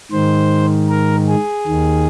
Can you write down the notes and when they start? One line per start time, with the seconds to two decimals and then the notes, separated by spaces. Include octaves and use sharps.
0.11 G#2 D#3 C5
0.89 A#4
1.28 G#4
1.67 D#2 D#3